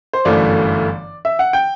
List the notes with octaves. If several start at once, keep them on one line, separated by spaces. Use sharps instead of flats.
C5
G1 F#2 E3 A3 D5
E5
F#5
G5